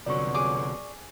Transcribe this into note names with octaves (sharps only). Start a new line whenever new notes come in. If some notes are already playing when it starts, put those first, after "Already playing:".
C2 F2 B2 D3 F#3 D5 C#6
G#4 D6